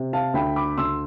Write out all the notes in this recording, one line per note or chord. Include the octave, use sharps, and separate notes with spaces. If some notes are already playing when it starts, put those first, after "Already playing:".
Already playing: C3
F5 A5
D2 G5 B5
B5 D6
D2 C6 E6